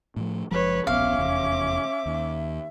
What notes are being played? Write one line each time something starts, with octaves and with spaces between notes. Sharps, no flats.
A2 E3 F3
F#1 F3 G#3 B4 C#5
D1 A#1 B3 C#4 E5 F5 D6
F1 E2
D#2